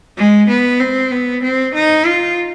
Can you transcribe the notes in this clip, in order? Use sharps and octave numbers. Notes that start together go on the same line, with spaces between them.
G#3
B3
C4
B3
C4
D#4
F4